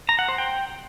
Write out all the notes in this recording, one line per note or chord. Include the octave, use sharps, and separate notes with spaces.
A#5
F#5
C5
G5